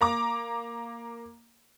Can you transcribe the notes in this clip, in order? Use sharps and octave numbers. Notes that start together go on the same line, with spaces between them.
A#3 A#5 D6